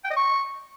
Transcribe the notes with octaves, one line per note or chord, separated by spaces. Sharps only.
G5
D#5
C#6